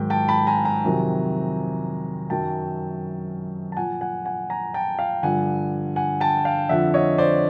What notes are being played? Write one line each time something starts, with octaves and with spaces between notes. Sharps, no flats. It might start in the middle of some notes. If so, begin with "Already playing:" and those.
Already playing: G#2 D#3 F#3 G5
G5 A5
A5 B5
G#5 A#5
G#5 A#5
F2 C3 D#3 F#3
F#2 D#3 F#3 G5 A5
A5
A#2 F3 F#5 G#5
F#5 G#5
F#5 G#5
G#5 A#5
G5 A5
F5 G5
G2 D3 F3 F#5 G#5
F#5 G#5
G5 A5
F5 G5
F2 D3 F3 E5 F#5
C#5 D#5
C5 D5